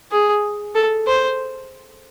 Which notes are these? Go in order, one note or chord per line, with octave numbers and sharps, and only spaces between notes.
G#4
A4
C5